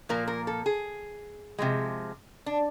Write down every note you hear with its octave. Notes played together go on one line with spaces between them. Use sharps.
A#2 F3 A#3 A#4
A#4
A4
G#4
C3 F3 G#3
D4